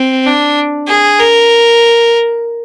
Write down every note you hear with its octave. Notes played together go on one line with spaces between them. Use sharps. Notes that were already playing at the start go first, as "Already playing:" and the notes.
Already playing: C4
D4
G#4
A#4